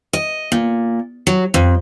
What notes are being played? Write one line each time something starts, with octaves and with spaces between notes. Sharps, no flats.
D#5
A#2
F#3
F2